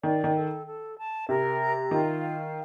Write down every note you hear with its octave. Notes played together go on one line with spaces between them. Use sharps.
D#3 D5
D#3
A4
A4
A5
C3 A#4
A#5
D#3 F4
F5